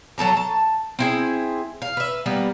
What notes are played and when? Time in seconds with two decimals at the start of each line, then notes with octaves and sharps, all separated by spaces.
0.18 F#3 A4 A5 A#5
0.37 A5
0.99 C4 E4 G#4
1.82 F5
1.97 B4 E5
2.26 G3 A#3 B3